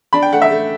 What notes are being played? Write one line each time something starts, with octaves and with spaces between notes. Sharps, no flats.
D4 B5
G5
A3 F#5
E5
A3